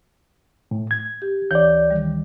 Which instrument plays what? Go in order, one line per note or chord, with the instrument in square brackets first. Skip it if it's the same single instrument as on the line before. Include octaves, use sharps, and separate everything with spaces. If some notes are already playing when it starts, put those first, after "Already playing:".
[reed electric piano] A2
G#6
[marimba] G4
[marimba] D2 E3 C#5 [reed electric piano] D5 G6
[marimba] D#3 G3